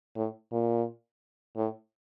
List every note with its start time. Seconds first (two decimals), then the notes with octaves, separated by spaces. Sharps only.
0.16 A2
0.52 A#2
1.57 A2